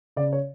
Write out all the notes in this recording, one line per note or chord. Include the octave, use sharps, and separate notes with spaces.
C#3 D5
C#5